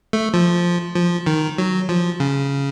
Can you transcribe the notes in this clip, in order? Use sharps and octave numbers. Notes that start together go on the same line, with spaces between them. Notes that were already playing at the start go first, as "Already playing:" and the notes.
A3
F3
F3
D#3
F#3
F3
C#3